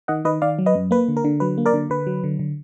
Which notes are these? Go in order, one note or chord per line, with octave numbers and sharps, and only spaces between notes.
D#3 D#5 F#5
D#3 B4 D#5
D#3 D5 F5
F#3
B4 D#5
F#2
A#3 B4
D3
A#4
D3
F#3 B4
A#3
A#4 D5
D3
D3 B4
F#3
D3
D3